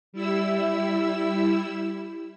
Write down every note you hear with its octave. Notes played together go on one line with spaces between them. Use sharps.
G3 E4 E6